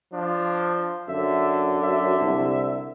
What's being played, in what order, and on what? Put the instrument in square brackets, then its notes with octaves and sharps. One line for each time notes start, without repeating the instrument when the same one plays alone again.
[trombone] F3 [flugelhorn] D4
[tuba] F#2 [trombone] D3 [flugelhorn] E5
[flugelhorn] E5
[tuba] C2